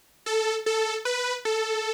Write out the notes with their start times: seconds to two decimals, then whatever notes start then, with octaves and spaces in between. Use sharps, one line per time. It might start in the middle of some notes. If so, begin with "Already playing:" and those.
0.26 A4
0.66 A4
1.05 B4
1.45 A4